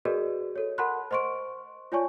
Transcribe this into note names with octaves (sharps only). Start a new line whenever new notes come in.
F#4 G#4 A#4 B4 D5 D#5
A4 C#5
A#4 F#5 A5 B5 C6 F#6
C5 D#5 C6 C#6 D7
F4 C#5 D5 G#5 A5 C#6